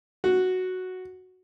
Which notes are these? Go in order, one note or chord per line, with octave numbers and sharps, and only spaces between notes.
F#4